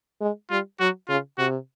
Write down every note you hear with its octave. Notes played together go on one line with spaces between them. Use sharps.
G#3
G3 F4
F#3 F#4
C#3 F4
C3 F#4